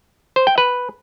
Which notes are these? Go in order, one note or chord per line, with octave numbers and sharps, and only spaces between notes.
C5
G5
B4